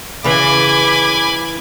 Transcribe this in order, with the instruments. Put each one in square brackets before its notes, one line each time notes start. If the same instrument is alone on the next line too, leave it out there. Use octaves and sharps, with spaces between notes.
[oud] C#3 E3 [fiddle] G#5 D6 [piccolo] B5